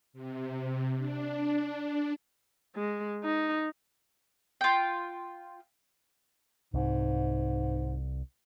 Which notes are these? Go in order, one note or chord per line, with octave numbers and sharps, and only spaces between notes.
C3
D4
G#3
D#4
F4 G5
C2 G#2